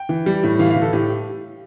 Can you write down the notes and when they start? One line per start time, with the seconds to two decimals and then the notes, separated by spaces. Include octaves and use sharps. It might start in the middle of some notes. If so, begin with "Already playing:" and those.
Already playing: G5
0.09 E3
0.26 G3
0.43 A2
0.59 E3 F5
0.71 F5
0.76 E3
0.82 A4
0.93 A2 G4